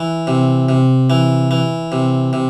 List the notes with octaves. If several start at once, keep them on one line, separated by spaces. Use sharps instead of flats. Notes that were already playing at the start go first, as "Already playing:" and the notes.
Already playing: E3
C3
C3
E3
E3
C3
C3